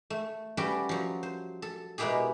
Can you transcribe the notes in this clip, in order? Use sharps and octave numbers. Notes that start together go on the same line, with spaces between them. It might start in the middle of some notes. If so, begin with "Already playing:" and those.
A3
G3 C#4 F#4 A4 B4 G5
F3 F#3
C5
A4
B2 G#3 A#3 E4 G4 G#4